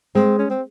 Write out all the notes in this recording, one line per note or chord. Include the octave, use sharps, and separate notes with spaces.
G#3 C4
C#4
C4